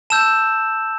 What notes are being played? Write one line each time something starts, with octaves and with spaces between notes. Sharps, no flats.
A5 E6 G6 E7